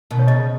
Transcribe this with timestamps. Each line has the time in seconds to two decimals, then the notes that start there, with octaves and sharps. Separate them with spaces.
0.11 B2 D#3
0.19 C#5
0.27 C#3 D#5